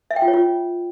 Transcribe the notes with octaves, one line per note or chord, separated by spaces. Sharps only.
E5
G5
F4
C#5
F4